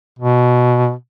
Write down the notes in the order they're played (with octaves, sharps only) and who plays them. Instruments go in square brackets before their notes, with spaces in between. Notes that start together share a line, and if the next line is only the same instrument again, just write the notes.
[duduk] B2